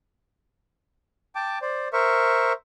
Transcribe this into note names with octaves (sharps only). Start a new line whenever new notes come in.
G5 A5 D6
C5 D5
A#4 C5 E5 C#6